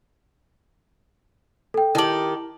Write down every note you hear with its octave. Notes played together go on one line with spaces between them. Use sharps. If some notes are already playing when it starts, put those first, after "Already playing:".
A4 G5
D#3 E4 G4 A5 F#7